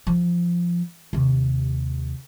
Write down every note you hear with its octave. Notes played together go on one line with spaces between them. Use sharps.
F3
D#2 C3